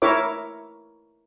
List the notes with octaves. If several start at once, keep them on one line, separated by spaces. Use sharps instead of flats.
E4 A#4 C#5 E5 D6